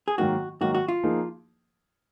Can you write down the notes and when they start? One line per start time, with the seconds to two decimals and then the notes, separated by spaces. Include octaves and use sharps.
0.08 G#4
0.18 G#2 D#3 F#3 A#3 F#4
0.61 G#2 D#3 F#3 A#3 F#4
0.75 F#4
0.88 F4
1.03 F3 A#3 D#4 G#4